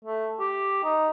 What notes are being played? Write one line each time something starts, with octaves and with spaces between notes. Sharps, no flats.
A3
G4
D#4